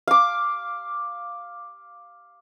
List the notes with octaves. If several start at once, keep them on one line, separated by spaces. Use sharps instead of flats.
F5 D6